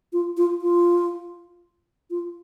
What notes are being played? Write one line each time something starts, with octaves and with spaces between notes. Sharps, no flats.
F4
F4
F4
F4